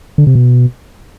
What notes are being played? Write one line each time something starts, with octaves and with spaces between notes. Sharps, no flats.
D3
C3
B2